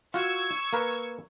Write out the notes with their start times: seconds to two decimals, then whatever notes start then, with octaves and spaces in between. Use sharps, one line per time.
0.14 F4 F#4 C#6 E6 G#6
0.73 A#3 A#4 B4